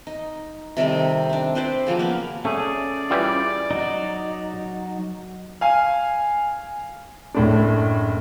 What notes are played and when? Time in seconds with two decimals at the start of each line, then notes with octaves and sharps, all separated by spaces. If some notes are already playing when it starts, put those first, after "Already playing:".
0.07 D#4
0.77 C3 D#3 G3 A3
1.29 C4 D4
1.55 C4 B4 C5 D5
1.87 C#3 F3 F#3 A#3
1.99 A#3 B3
2.45 A3 C#4 G#4 D5
3.10 E3 G3 F4
3.71 F#3 D#4
5.61 F5 G#5
7.34 F#1 A2 D4